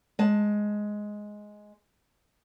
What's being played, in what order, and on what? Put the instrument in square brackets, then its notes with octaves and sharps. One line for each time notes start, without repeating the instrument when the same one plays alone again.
[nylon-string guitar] G#3 A5